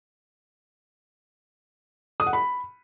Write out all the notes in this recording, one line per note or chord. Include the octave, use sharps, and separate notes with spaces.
D#6
F#5
B5